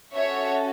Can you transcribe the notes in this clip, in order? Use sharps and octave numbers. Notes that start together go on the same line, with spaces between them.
C#4 F#4 A4 C#5 E5